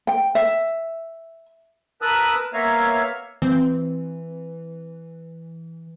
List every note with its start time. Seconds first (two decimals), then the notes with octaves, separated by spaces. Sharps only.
0.07 G5
0.35 E5
2.02 A#4 B4 A5 D#6 E6 F#6
2.53 A#3 B3 C#5 E5 F5 A#5
3.42 E3 C4